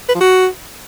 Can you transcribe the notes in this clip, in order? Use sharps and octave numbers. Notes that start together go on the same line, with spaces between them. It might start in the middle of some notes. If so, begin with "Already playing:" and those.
B4
F3
F#4